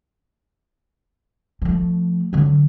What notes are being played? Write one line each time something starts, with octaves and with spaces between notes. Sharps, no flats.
F3 A3
D3 F#3